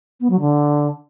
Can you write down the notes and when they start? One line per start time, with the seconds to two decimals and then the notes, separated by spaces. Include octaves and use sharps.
0.20 B3
0.30 F#3
0.40 D3